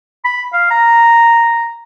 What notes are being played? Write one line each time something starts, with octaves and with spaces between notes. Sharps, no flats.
B5
F5
A#5